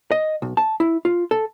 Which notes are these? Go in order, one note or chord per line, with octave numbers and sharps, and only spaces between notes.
D#5
B1
A5
E4
F4
A4